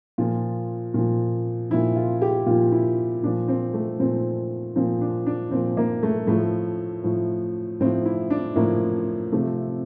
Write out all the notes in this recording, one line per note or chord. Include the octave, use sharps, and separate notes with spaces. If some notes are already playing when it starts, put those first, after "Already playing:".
A#2 F3 F4
A#2 F3
A#2 F3 E4
F4
G4
A#2 F3 F4
E4
A#2 F3 D4
C4
A3
A#2 F3 C4
A#2 F3 C4
D4
D4
A#2 F3 C4
A#3
A3
A2 F3 A3
A2 F3
A2 F3 C4
E4
D4
A2 F3 A#3
C3 F3 A3